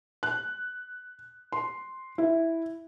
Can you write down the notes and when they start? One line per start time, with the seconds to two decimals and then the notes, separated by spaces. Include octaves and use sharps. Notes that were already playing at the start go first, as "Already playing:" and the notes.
0.23 F#6
1.52 C6
2.18 E4